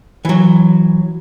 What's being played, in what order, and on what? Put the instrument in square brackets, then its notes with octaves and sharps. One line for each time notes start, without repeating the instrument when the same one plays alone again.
[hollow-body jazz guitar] E3 F#3